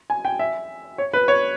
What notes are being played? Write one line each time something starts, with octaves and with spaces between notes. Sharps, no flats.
G#5
G5
E5
C#5
B4
C#5